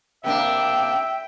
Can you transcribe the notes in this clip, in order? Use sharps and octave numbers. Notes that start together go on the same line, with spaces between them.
C3 A#3 D4 E5 G5